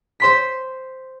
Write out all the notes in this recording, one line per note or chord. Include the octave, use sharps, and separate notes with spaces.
C5 C6 B6